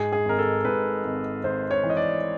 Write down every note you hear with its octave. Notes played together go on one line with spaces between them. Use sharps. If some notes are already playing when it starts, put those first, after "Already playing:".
Already playing: G#2 G#4
G#4
G#1 A#4
A4
G#2 B4
G#1
G#1 C5
C#5
E3
D#5
D5